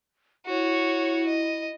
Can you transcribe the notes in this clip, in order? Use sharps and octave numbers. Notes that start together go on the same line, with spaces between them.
E4 F#4 C#5
D#5